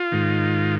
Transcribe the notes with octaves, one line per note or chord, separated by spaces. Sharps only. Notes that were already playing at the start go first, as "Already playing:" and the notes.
Already playing: F4
G#2 D#3